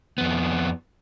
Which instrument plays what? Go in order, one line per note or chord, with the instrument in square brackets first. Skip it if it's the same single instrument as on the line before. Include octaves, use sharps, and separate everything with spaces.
[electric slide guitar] F2 B3